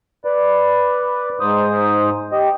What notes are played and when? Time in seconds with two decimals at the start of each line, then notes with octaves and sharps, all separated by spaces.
0.25 B4 D5
1.40 G#2 C5 D#6
2.32 G4 D#5